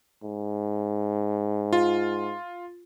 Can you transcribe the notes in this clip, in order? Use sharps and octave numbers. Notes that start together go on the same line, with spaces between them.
G#2
F4